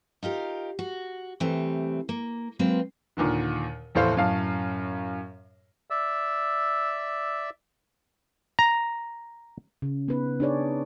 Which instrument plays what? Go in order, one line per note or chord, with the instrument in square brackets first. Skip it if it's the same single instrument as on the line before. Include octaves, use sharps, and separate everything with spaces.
[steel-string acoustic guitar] D#4 F4 G4 A#4
F#4
C3 E3 G3 A3 C4
A#3
F#3 G#3 A#3 C4 B4
[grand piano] D#2 A#2 D3 D#3
F1 E2 A2 A4 C5 F5
F#2 A2 F5 A5
[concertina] D5 E5 E6
[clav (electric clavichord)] A#5
[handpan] C#3
B3 D#4 B4
D4 D#4 G#4 C#5 D5